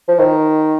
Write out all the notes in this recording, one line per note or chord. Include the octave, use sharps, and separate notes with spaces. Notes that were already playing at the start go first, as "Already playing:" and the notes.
F3
D#3